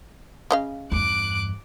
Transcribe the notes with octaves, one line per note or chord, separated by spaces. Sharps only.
C#3 D#5 F5
E2 G2 D6 F#6